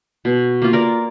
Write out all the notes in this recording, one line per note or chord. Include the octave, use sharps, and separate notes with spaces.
B2
A#3 F4
A#4 D5